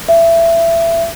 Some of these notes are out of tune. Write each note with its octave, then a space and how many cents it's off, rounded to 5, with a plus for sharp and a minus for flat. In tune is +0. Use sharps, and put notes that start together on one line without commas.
E5 +20